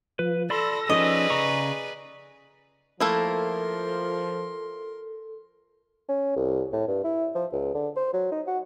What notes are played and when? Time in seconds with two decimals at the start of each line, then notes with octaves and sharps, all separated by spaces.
0.19 F3 B4
0.50 A4 D5 B5 C6 E6 A#6
0.89 F3 C#4 D#4 G#4 B4 D5 D#5
1.30 C#3 A#5 C#6
3.00 F3 A3 A#3 E4 A4 A#4 C6
6.09 C#4
6.36 C2
6.73 A2
6.88 G2
7.04 E4
7.35 F3
7.53 C#2
7.75 D3
7.96 C5
8.13 F#3
8.32 D#4
8.47 F#4